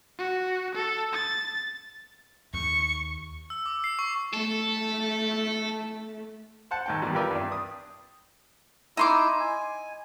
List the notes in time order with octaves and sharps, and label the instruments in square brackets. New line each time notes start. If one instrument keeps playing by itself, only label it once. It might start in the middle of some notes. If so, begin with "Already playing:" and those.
[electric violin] F#4
A4
A6
[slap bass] D#2 [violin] C#6
[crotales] E6
D6
C7
C#6
[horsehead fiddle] A3 [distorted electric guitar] A4
[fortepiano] C5 F#5 A5
D#2 G#2 G5
E2 G3
F4 G4 A#4 B4 D5 E5
G2 D4
D#6
[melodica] D#4 E4 E6 [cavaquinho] D#5 C6 D6
[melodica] G#5